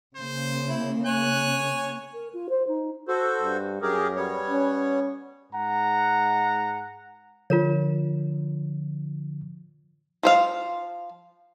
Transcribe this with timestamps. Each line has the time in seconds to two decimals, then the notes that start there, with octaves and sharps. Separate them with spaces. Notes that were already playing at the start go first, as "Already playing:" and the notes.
0.16 C#3 A#3 C5
0.68 E4
1.06 C#5 G#5 F#6
2.14 A#4
2.33 F4
2.49 C5
2.67 D#4
3.08 F#4 A4 C5
3.42 G2
3.82 F#2 G4 G#4 A#4
4.16 G3 B3 C#5
4.50 C#4
5.52 G#2 F#5 A#5
7.50 D3 F3 F4 A#4 C#5
10.23 F3 C5 F5